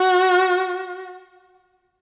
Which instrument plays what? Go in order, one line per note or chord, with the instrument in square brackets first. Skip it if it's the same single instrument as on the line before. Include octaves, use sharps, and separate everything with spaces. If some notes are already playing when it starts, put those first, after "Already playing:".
Already playing: [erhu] F#4